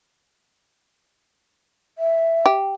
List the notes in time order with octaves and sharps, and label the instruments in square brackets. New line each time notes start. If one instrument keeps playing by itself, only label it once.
[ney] E5
[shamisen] G4